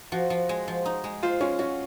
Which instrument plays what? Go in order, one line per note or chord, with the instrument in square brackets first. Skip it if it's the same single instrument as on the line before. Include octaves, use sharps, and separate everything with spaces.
[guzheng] F3 [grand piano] F#4
[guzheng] F3
G#3
F3
D#4
G#3
[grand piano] F4 [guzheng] C5
[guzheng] G#3 [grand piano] C#4
[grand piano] C#4 [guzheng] F#4